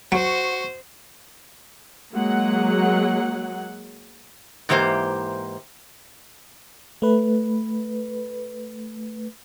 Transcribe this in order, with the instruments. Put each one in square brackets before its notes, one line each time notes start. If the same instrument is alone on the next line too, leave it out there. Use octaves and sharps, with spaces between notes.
[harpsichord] F#3 [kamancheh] F#4 C#6 [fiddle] C5
[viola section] F#3 G#3 A#3 F#5
[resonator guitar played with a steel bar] G#2 E3 A#3 G4 C5
[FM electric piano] A3 B4